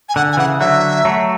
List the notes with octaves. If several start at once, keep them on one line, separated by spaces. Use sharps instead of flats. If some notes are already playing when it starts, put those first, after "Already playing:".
G#5
D3 F#5
G#5
C#3 E3 F#5
D3 F#3 E5
F#3 A3